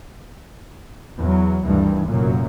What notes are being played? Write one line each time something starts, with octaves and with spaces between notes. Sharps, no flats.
E2 F#3
D2 G2 D#3 E3
F1 F#2 A#2 F#3 A#3